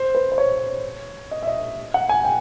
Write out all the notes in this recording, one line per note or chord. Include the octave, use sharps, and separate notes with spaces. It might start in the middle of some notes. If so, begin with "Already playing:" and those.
Already playing: C5
B4
C5
C#5
D#5
E5
D#5
F#5
G#5
G5